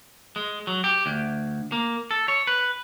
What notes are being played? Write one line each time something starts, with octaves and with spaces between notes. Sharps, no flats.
G#3
F#3
G4
D2
A#3
A4
C#5
B4